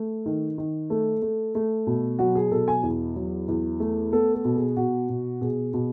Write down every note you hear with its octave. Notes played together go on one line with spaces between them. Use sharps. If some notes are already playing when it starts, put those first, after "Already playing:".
Already playing: A3
D#3
D#3
A3 A4
A3
A3
B2
F#3 F#4
G#4
B2 A4
G#5
E2
F#3
E2
A3
B3 A4
A4
B2
G#4
B2 F#4
B2
B2 G#4
B2